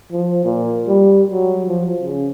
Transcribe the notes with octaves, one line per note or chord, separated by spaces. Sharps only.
F3
A#2
G3
F#3
F3
C#3